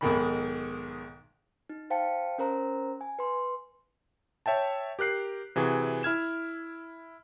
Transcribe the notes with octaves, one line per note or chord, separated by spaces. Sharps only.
B1 G#2 D#3 B5
D#4
C5 F5 G5 A5 C#7
C#4 A#4 C5 A#5
G#5
B4 C6
C#5 E5 G5 A5
G4 A#4 F#6 C7
C3 E3 F#4 G#4
E4 F6 G#6 E7